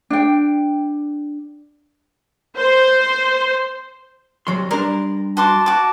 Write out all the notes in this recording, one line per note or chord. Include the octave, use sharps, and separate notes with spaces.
D4 G5
C5
C2 F#3 C6
G3 D4 A#4 C6
F#4 A5 C6 D6
F#4 D6